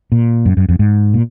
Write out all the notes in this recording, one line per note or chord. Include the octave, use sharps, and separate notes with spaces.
A#2
F#2
F#2
F2
G#2
A#2